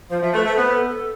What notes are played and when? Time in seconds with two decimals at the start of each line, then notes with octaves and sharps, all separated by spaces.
0.10 F3 C5
0.22 F3 E5
0.34 A3 B4
0.44 A3 C5
0.57 B3 C5
0.68 B4
0.72 A4
0.88 A4